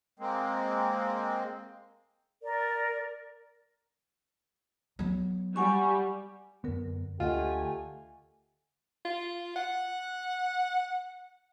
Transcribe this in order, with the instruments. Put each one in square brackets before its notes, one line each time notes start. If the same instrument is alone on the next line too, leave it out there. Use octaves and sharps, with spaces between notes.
[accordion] G#3 A#3 C4
[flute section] A#4 D5
[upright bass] F#3 B3
[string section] G3 [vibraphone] F#5 G#5 C#6
[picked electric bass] F#2 B3 [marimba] D3 A#4
[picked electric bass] D2 [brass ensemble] A3 G4 G#5 [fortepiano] F4 [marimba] D#5 F#5
[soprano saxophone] F4
F#5